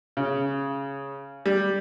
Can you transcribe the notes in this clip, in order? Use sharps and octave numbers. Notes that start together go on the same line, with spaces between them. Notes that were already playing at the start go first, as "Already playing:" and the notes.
C#3
G3